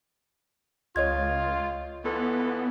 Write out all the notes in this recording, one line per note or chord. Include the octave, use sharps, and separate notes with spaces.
C#2 F4 C#5 D#5 G#6
E3 B3 F4 A4